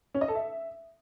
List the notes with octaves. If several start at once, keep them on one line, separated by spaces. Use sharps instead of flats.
C#4
D#5
A4
E5